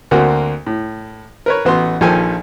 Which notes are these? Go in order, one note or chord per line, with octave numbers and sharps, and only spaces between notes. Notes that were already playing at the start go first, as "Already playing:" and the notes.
D2 A#3 C4 F#4 A#4
A2
A#4 B4 C#5
A1 B3 F#4 C6
A#1 D#3 F3 A4 G5 G#5